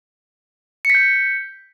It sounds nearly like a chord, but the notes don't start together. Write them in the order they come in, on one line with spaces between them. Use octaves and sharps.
C#7 B6 G6